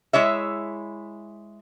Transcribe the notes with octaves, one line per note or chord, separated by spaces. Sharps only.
G#3 E4 C#5 E5